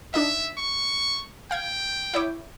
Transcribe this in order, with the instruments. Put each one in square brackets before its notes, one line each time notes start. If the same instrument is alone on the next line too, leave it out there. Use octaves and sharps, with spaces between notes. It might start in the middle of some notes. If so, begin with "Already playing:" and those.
[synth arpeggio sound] D4 D#4 D#5 [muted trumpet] E5
[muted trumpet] C#6
[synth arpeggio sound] F5 G#6 [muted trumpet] G5
[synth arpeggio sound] E4 C#5 D6